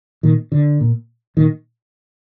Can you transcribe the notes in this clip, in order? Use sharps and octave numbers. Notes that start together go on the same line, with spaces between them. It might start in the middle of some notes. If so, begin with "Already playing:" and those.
A#2 D#3
D3
A#2
A#2 D#3